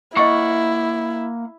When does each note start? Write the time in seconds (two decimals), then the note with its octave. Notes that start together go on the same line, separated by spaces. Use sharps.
0.17 A#3 E4 D#5 F#5 C#6